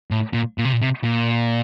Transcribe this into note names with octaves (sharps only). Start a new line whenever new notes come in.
A2
A#2
A#2
C3
A#2
C3
A#2